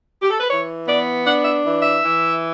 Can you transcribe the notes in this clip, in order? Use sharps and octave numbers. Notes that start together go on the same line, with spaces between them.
G4
A4
B4
E3 C#5
B3 D5
D4 F#5
E5
E3
E5
E3